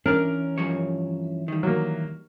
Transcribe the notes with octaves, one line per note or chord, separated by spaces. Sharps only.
E3 C#4 D4 A#4 D5 F6
G2 F3 C#5
D#3 G3
F#3 A#3